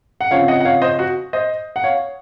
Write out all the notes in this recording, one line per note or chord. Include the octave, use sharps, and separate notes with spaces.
F#5
C#3 F3 C4 C#5 F5
D#5 F#5
F#5
C#5 F5
C5 D#5
F#4
C5 D#5
F#5
C#5 F5